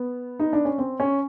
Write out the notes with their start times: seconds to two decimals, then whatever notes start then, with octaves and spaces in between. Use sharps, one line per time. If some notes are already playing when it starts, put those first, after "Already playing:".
Already playing: B3
0.40 D#4
0.53 D4
0.65 C#4
0.78 C4
1.00 C#4